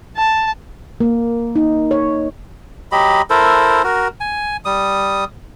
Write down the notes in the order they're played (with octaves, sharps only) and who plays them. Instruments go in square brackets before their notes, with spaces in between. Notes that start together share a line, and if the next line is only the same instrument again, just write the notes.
[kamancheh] A5
[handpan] A#3
D#4
C#5
[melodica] F#3 G4 D#5 B5
E4 A4 A#4 C5
F#4 A#4
G#5
G3 D#6